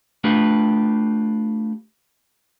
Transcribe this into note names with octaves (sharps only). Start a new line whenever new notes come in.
A3 D4 F4 G4 B4